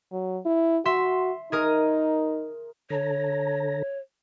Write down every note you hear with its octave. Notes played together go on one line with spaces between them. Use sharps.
F#3
E4
F#4 E5 C6
D#4 G#4 A#4 D#6
D3 A4 C#5 A#5